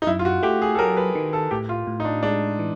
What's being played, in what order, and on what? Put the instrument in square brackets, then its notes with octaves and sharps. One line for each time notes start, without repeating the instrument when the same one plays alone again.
[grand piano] D#4
[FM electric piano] F#2 [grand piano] E4
[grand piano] F4
F#4
[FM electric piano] A3 [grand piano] G4
[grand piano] G#4
A4
[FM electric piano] F#3 [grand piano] A#4
[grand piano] B4
[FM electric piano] D#3
[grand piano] A4
[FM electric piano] A2 [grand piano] G4
[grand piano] F4
[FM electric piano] A2
[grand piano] D#4
D4
[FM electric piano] G#3 [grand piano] D4
[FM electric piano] E3